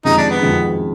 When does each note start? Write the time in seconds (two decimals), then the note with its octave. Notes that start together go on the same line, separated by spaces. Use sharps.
0.05 F2 C3 D#3 G#3 D#4
0.17 D4
0.30 B3
0.41 F2 C3 D#3 G#3